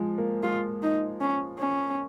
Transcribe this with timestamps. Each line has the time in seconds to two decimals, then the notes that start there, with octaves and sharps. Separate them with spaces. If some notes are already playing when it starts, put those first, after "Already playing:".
Already playing: F3 G#3
0.18 A#3
0.43 G#3 F4
0.82 D#4
1.20 C#4
1.59 C#4